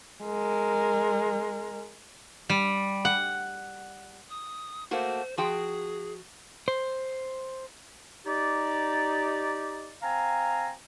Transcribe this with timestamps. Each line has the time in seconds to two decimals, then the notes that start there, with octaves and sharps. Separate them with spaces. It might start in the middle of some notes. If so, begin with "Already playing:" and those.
0.23 G#3 A#4
2.49 G3
3.05 F#5
4.29 D#6
4.91 A3 A#3 F#4 C5
5.37 F3 F#4 G#4 G5
6.68 C5
8.26 D#4 G4 D5
10.02 C4 F5 G#5 A#5